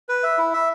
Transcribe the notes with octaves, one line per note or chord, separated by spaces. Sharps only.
B4
E5
E4
E5